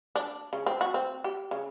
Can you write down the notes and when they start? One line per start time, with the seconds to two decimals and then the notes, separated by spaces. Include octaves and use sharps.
0.16 D4
0.53 C#3
0.66 C4
0.81 F#4
0.94 C4
1.24 G4
1.51 C#3